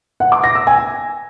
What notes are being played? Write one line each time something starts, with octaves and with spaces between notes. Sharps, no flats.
F#5
D6
A#6
E6
G#5